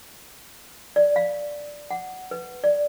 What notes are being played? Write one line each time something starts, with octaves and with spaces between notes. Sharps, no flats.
D5
F5
F#5
B4
D5